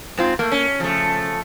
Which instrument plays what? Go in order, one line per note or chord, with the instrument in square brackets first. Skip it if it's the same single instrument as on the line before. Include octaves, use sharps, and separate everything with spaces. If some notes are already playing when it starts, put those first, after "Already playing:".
[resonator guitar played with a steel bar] G#2 C4 F4
[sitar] A3 [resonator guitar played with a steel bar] A#3
[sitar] C#4
[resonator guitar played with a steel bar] C#3 [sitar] F3 A3